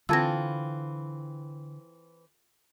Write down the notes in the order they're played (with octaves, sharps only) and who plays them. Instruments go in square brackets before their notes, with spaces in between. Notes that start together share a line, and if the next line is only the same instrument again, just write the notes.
[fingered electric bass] D3 [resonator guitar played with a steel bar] E3 C4 [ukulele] F4 A4 [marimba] E6 G#6 A#6